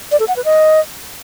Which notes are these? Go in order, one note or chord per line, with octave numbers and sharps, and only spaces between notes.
D5
A4
F#5
B4
D#5